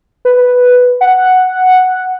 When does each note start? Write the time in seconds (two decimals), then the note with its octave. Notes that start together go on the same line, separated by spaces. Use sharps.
0.25 B4
1.01 F#5